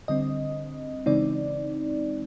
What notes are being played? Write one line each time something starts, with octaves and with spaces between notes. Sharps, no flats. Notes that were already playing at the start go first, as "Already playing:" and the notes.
D3 G3 C4 D#5
C#3 E3 G#3 C4 D#4 D5